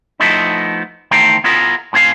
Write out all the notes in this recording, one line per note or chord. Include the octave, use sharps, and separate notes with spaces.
F3 A3 B3 D#4 E4
E2 D#3 A3 C5 G5 A#5
B3 E4 F4 G#4 A#4
A2 C4 G#4 F5